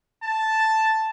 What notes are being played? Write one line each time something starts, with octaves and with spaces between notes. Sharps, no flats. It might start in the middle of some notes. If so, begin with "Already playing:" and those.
A5